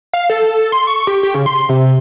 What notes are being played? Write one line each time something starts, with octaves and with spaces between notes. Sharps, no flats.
F5
A4
C6
C#6
G4
G4
C#3
C6
C3